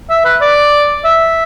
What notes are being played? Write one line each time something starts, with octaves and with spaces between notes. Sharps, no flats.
E5
B4
D5
E5